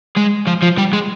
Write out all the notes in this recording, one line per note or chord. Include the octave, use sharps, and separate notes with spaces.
G#3
F3
F3
G3
G#3